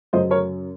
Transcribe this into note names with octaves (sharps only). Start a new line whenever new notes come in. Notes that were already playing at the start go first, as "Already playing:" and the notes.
F#2 C#3 F#3 C5 D#5
A#4 C#5